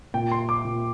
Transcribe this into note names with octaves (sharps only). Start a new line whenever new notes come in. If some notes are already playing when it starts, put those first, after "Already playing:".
A#2 G5
C6
D6
A#2